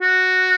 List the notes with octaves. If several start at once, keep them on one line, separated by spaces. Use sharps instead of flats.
F#4